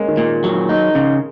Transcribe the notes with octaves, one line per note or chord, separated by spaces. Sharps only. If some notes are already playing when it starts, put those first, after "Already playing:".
Already playing: G#3 A#3 C#4
D#3
A#2
F#3
D#4
C#3